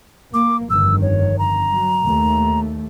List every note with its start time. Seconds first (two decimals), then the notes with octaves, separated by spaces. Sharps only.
0.34 A#3 D6
0.70 G1 F2 D#3 E6
1.02 C#5
1.39 A#5
1.71 F#3
2.04 D#2 A3